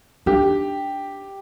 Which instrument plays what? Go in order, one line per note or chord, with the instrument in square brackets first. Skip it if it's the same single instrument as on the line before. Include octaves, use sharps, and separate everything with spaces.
[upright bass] D4 [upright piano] G4